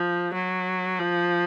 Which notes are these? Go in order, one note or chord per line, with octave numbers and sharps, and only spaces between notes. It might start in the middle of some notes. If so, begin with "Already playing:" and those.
Already playing: F3
F#3
F3